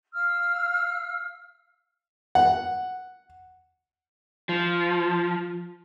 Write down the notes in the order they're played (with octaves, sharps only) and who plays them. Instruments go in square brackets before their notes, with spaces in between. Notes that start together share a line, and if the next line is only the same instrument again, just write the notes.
[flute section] F5 E6 F6
[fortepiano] F#5
[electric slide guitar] F3